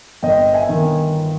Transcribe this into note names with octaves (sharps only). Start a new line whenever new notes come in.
G1 D#5 G5
E5 G#5
D#3